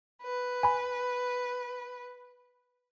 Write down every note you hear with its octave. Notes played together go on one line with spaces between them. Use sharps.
B4
G#5 B5